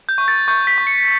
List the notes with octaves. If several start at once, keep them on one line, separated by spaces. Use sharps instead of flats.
G6
C#6
A6
C#6 G6
B6
C#6
C#7